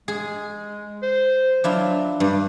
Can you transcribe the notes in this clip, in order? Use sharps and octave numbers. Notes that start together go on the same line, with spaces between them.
G#3 G#4
C5
F#3 D4 E4 F4
G2 G4